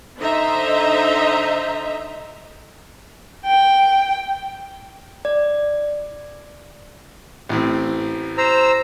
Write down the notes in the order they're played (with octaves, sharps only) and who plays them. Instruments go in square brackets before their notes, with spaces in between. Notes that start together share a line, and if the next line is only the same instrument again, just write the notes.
[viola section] D3 D#4 C5 D#5 E5 A#5
[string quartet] G5
[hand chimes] D5
[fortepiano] A1 A2 C4
[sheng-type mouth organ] C5 A#5 E6